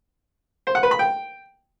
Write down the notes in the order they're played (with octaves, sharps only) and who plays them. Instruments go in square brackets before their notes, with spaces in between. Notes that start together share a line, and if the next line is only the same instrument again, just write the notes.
[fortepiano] C5
F#5
B4
B5
G5